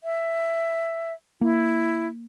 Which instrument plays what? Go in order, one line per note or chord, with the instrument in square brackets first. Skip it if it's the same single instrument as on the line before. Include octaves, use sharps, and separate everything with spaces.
[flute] E5
[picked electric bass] A#3 [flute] E4